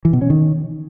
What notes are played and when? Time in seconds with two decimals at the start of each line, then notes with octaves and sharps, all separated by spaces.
0.05 E3
0.13 B2
0.22 C#4
0.30 D#3